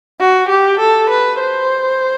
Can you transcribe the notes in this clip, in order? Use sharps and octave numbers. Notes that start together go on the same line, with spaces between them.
F#4
G4
A4
B4
C5